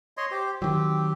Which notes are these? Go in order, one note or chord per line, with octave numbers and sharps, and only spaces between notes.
C#5 D#5 C6
G4 C5
D#3 F#3 C4 G4